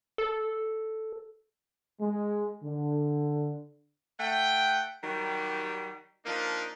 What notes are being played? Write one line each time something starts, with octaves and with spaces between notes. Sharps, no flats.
A4
G#3
D3
A3 F#5 G5
D#3 F#3 G3
F3 A#3 D4 D#4